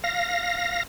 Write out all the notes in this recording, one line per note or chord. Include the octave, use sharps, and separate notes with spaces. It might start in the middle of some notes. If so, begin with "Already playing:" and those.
F5 A#6